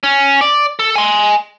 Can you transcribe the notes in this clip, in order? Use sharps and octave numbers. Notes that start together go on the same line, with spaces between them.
C#4
D5
A4
G#5 C6